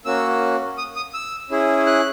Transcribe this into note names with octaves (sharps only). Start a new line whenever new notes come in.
A#3 C#4 F#4 E6
D#6
D#6
E6
C#4 E4 G#4
F#6